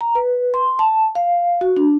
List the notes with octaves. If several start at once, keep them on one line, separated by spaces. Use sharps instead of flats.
A#5
B4
C6
A5
F5
F#4
D4